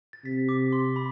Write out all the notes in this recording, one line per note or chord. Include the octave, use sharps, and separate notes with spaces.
A6
C3 B6
D6
C6
B5